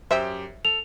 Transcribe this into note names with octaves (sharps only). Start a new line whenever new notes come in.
F#2 G4 C5 E5 G5
A4 F7